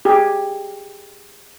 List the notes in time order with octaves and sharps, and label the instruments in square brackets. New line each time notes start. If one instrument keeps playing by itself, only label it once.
[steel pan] G4 G#4